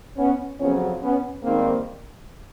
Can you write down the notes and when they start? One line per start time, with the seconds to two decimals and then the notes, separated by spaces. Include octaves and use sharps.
0.17 B3 C#4
0.59 F2 C#3 F#3 B3 C#4
1.01 B3 C#4
1.43 G#2 D#3 G3 A#3 C4